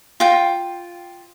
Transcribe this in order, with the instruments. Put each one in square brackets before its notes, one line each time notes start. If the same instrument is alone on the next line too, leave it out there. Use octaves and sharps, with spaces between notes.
[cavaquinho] F4 G5